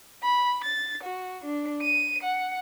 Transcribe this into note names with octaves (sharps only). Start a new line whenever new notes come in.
B5
A6
F#4
D4
D#7
F#5